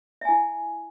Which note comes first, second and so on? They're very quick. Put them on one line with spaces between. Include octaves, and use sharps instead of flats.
E5 G#5 E4